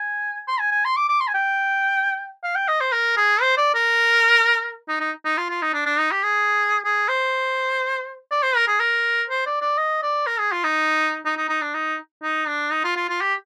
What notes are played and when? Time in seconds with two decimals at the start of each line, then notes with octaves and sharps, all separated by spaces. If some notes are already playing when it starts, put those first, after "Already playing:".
Already playing: G#5
0.48 C6
0.59 G#5
0.71 G#5
0.85 C6
0.97 D6
1.09 D6
1.20 C6
1.28 G#5
1.34 G5
2.44 F5
2.55 G5
2.68 D#5
2.81 C5
2.92 A#4
3.17 G#4
3.42 C5
3.57 D5
3.75 A#4
4.89 D#4
5.00 D#4
5.25 D#4
5.38 F4
5.50 F4
5.62 D#4
5.73 D4
5.86 D4
5.99 D#4
6.11 G4
6.23 G#4
6.84 G#4
7.08 C5
8.31 D5
8.43 C5
8.56 A#4
8.68 G#4
8.80 A#4
9.30 C5
9.46 D5
9.61 D5
9.78 D#5
10.03 D5
10.26 A#4
10.39 G#4
10.52 F4
10.64 D#4
11.26 D#4
11.37 D#4
11.49 D#4
11.62 D4
11.74 D#4
12.23 D#4
12.47 D4
12.72 D#4
12.84 F4
12.96 F4
13.09 F4
13.21 G4